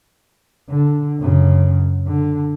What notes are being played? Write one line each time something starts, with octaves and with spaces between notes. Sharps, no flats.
D3
F#2 C#3
D3